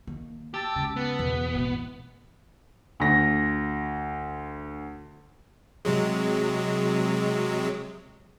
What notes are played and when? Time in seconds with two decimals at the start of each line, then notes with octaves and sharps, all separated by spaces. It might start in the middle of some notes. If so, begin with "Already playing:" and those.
0.07 D#3 A#3
0.54 G4 A5 E6 A6
0.76 G#2 C#3
0.96 B3
1.19 E2 B2 E3
1.55 G#2 B2 E3
3.00 D2 A#6
5.85 C3 F#3 G#3